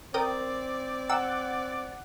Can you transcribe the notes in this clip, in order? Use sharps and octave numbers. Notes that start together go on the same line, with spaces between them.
C4 A#4 D5 G5 D#6
F#5 E6